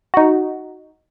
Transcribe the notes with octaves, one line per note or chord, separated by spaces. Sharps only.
D#4 F#4